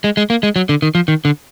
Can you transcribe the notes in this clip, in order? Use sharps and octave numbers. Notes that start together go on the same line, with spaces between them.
G#3
G#3
A#3
G#3
F#3
D3
D#3
F3
D#3
D3